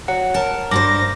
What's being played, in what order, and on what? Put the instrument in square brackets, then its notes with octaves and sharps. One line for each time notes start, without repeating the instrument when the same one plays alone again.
[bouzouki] F#3 [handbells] F#5
[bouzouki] A#4 [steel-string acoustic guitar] A5
[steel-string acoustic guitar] G2 G4 C5 [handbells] D6 [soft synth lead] A#6